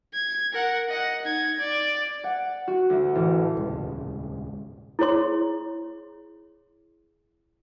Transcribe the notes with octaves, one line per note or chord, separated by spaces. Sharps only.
G#6
A#4 F#5
D#5 F#5
D#4 G#6
D5
F#5
F#4
D2
A1
D#1 G#1 C#2 G#3
E4 G#4 C#5 C6